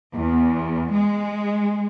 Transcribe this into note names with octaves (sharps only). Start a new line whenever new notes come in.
E2
G#3